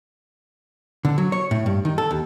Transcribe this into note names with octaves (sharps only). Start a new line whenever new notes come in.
D3
F#3
C#5
A2
G2
D#3
A4
D#2